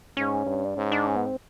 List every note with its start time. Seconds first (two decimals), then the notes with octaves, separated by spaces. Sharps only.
0.17 G#2 C#4
0.46 G2
0.65 D4
0.77 G#2 C#4
0.92 D4
1.07 C#4
1.16 B3
1.26 C4